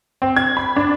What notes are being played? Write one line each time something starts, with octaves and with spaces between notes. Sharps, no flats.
C4
G#6
B5
D4